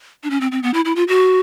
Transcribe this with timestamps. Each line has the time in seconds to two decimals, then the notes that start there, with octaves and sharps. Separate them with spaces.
0.23 D4
0.30 C#4
0.41 C4
0.52 C4
0.63 B3
0.74 E4
0.85 E4
0.96 F4
1.08 F#4